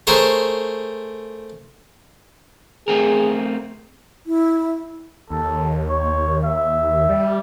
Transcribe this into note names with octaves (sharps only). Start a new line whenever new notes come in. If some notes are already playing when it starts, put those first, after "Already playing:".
A3 G#4 A#4 C5 C#5
A3 C4 G#4 A#4
E4
D#2 A4
C#5
E5
G3